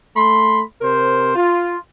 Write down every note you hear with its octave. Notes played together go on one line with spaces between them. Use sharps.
A3 B5 C6
C3 A#4 C5
F4